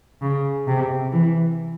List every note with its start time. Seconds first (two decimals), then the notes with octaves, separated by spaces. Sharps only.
0.22 C#3
0.67 C3
1.12 E3